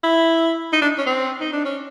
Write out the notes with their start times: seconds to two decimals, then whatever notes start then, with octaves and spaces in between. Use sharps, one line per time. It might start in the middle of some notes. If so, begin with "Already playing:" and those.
0.04 E4
0.73 D#4
0.82 D4
0.98 C#4
1.07 C4
1.41 D#4
1.53 D4
1.65 C#4